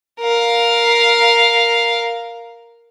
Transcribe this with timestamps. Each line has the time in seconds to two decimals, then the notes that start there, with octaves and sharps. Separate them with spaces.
0.21 A#4 F5